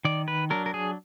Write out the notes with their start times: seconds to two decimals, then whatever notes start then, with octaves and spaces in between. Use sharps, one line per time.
0.05 D#3 D5
0.28 B4
0.50 F#3 D4 A#4
0.66 A#4
0.74 G#4